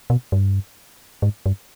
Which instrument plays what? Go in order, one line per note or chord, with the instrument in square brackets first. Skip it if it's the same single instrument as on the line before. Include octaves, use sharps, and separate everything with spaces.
[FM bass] B2
G2
G#2
G2